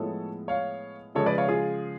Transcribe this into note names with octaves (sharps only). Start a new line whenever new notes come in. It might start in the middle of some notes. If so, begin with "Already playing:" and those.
Already playing: A2 F3 G#3 B3 A4 C#5
C#5 F5
C#3 F3 G#3 A4 C#5
B4 D5
C#5 F5
F4 G#4